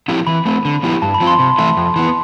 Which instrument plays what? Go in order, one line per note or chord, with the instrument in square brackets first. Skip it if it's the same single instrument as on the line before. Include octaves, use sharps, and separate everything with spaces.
[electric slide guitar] F3 C4 E4 G4
[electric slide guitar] E3 [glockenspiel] B5
[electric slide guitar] A3 C4
D3
F3 B3 E4 G4
[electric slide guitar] G2 [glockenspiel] A5
[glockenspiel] B5
[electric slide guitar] F3 C4 F4
[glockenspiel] C6
[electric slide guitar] C3
E3 A3 E4
F2
E3 B3